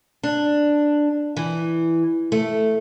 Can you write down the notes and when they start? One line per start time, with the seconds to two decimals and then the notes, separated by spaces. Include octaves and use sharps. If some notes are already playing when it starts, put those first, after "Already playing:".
0.23 D4
1.37 E3
2.32 A3